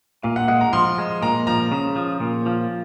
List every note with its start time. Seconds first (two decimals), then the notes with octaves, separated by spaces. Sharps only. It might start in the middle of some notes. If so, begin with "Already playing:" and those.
0.23 A#2 F5
0.36 F#5
0.48 G#3 F#5
0.61 A#5
0.73 F3 C6
0.98 G#3
1.22 A#2 A#5
1.47 F3 A#5
1.72 C#3
1.96 F3
2.20 A#2
2.46 F3